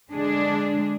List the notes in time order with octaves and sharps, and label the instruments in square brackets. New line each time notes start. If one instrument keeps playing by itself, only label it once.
[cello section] D3 G#3 D4 G#4